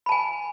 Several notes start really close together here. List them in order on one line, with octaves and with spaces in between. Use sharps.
B5 A5 G#5